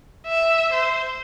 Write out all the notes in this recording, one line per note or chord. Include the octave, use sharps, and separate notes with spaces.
E5
C5